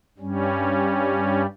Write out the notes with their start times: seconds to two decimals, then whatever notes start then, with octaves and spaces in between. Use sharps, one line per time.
0.18 G2 G3 C#4